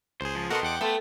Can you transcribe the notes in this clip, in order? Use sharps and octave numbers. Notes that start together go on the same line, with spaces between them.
C#2 G#4 C5
F3
B2 B3 F#4 A4 A#4 D#5 F#5 C6
E2 F#5 G5 D6
A3 B3 A4 C5